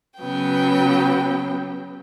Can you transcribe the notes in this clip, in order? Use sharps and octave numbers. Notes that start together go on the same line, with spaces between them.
C#3 F#3 B3 G5